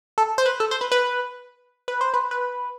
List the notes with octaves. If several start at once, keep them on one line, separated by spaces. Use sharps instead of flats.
A4
C5
B4
A4
C5
B4
B4
B4
C5
B4
B4